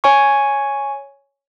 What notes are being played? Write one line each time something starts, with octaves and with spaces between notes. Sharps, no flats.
C#5 G#5 C#6